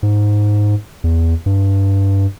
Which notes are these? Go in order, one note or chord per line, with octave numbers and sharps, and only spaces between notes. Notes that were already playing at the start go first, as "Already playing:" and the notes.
G#2
E2
G2